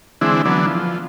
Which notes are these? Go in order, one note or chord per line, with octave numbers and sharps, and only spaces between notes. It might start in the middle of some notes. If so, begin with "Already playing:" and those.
D3 E3 G#3 C4 D4 E4
D3 E3 F#3 B3 D4
F3